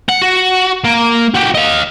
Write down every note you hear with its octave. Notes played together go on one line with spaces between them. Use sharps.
F#5
F#4
A#3
F#4 G4
D#5 F5